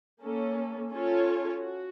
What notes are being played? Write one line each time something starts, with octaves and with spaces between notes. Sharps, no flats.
A#3 C#4 A4
C#4 F4 A4 C#5
F#4